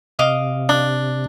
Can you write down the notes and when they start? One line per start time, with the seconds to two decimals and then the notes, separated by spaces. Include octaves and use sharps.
0.19 C3 D#5 F5 D6
0.69 D4